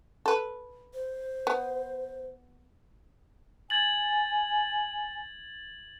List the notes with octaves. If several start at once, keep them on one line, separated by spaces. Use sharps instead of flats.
A4 B4
C5
B3
G#5 G#6 A6 F#7